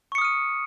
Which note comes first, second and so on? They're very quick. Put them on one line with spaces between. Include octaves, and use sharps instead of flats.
C#6 C#7 D#6 F6 D#7